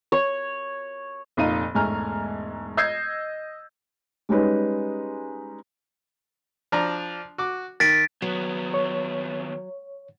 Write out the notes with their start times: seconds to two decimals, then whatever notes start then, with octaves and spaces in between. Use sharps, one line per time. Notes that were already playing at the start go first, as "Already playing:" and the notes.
0.12 C#5
1.37 F1 A#2 D#4 F5 D#7
1.75 E1 G#2 A3 G#5 A#5 F6
2.77 D#5 E6 G6 G#6 C7
4.29 G3 G#3 C#4 D#4 B4
6.72 F3 D4 A#5
7.38 F#4 D6
7.80 D#3 A6 B6 D7
8.22 D#2 F#3 B3
8.74 C#5